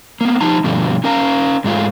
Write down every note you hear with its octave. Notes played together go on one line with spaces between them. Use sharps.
A#3 B3
F3 D#4 A5 A#5
G2 B2 D3 F3 A3
C#4 A#4 F5 A#5
G#2 G#3 A3 F4